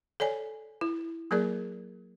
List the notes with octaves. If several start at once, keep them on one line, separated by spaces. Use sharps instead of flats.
A4 C#5 D5 G#5
E4
F#3 A#3 G#4 A#4 D5